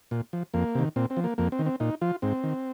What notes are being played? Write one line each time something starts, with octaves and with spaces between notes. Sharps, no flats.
A#2
F3
F2 A#3
C3 D#3
A#2 C4
C4
F3
A#3
F2 A#3
C4
D#3
C4
A#2 D#4
F3 F4
G#2 C4
D#3